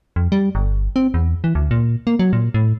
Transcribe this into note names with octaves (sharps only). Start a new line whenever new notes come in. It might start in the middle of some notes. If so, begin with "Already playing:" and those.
F2
G3
G1
C4
E2
E3
D2
A#2
A#3
F#3
A#2
A2